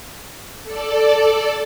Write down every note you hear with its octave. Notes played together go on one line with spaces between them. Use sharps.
A4 D5